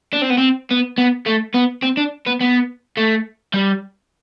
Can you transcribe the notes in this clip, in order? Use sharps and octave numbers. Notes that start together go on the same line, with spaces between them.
D4
C4
B3
C4
B3
B3
A3
B3
C4
D4
B3
B3
A3
G3